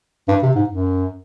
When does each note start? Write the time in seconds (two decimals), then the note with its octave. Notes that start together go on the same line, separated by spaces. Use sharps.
0.28 G2
0.43 C3
0.55 G#2
0.69 F#2